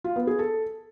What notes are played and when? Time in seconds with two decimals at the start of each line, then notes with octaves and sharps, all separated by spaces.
0.04 F4
0.16 B3
0.27 G#4
0.39 A4